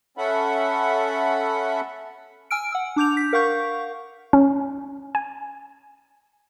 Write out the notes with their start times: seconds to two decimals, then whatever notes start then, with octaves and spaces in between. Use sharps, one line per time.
0.18 C#4 A4 E5 F#5 B5
2.51 G#5 E6 F6 D7
2.72 F#5 E6
2.96 D4 D6 G6 F7
3.17 B6
3.33 A#4 F5 F#5 C#6 G6
4.33 C#4
5.15 G#5